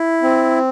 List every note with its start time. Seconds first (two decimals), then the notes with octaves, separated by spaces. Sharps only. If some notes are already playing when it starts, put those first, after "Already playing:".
Already playing: E4
0.22 C4